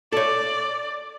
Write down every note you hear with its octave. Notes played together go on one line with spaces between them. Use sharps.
A4 C#5 D5